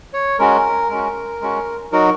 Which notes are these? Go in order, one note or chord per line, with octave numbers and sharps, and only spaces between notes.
C#5
G#3 C#4 F#4 A#4
G#3 C#4 F#4
G#3 C#4 F#4
F#3 D#4 F#4 A#4